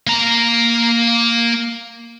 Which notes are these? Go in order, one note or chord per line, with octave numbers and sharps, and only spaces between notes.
A#3 A#5